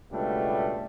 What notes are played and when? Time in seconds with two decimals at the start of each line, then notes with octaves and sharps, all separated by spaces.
0.12 C#2 B2 G3 A3 D4